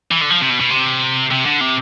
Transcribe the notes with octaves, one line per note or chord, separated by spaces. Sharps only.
E3
D3
F3
C3
B2
B2
C3
C3
D3
C3